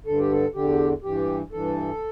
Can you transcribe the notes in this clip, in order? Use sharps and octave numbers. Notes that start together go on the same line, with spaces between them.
G2 D3 A4
G4
A4
E2 D3 G4
G2 E3 G4
G2 E3 A4